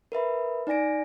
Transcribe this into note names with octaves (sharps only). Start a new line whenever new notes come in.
A#4 B4 E5 B5
D#4 D5 G#5 A#6 D7